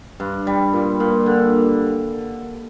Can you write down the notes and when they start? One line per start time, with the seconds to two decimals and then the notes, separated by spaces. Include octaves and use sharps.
0.20 G2
0.47 G3
0.73 A#2
1.00 A#2
1.26 D3